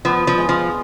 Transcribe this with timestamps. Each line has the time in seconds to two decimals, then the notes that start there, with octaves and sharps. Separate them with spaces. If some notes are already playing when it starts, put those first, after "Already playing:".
0.05 F3 B3
0.27 F3
0.38 G#3
0.49 F3